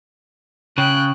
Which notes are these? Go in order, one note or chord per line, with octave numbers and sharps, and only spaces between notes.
C#3 G5 F#6